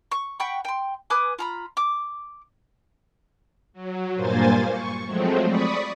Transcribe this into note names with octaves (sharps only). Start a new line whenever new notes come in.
C#6
F#5 G5 B5 C#6
G5 C6
B4 G#5 D6 D#6
F4 A#5 B5
D6
F#3
G2 A#2 A#3 C5 G#5 A6
C#6
F3 F#3 G#3 A3 C4
D5 B5 C#6 D#6 B6